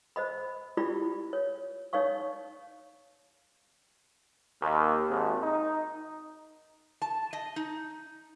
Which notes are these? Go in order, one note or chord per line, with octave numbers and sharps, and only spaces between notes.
C5 D#5 B5
E4 F4 G4 D5 B5
C#5
D#4 C#5 D5 F5 C#6
D#2
G#1
D#4
A5
D#5
D#4